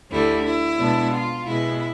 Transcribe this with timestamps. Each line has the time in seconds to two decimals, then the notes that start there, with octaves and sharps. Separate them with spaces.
0.11 D2 D3 G3 E4
0.45 E4
0.79 B2 G#3 B3 D4
1.13 F4
1.46 B2 G#3 B3 E4